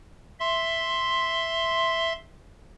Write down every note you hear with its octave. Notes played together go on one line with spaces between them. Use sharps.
E5 C6